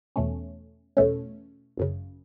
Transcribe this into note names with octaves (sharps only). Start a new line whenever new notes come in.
E2 B2 A3 C#4
E2 B2 A3 C#4
G#1 F#2 C#3